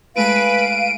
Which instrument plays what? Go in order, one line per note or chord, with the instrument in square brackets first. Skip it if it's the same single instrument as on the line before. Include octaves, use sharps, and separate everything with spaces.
[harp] G#3 A3 E4 [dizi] B4 [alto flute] F5 [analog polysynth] D7 D#7